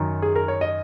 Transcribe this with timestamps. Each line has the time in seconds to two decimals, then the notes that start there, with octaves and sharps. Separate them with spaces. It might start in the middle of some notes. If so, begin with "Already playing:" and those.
Already playing: F#2 D#3
0.22 G#4
0.36 A#4
0.48 C#5
0.61 D#5